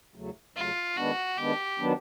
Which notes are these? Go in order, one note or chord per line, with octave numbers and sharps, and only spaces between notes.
E2 C#3 F#3 A3
E2 C#3 F#3 A3 F4
D#3 G#3 B3 D4 F#4
D#3 G#3 B3 D4 G4
D#3 F#3 B3 D4